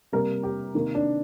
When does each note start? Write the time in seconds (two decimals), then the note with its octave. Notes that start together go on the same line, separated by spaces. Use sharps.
0.12 C3 G3 A#3 A#4
0.43 G4
0.74 C3 D#3 A#3
0.95 D4